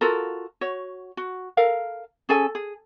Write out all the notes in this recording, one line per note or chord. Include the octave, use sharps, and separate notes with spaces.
F4 F#4 A4 A#4
F#4 C#5
F#4
A4 A#4 F5
C#4 G#4 A4 G#5
G#4